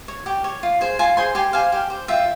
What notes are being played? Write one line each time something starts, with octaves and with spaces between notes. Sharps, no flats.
C#5
G4
C#5
F4
G#4 C5
F4 G#5 C6
G#4 C5 G#5 C6
G4 G#5 C6
C5 F5 G#5
G4
C5
F4 E5 G5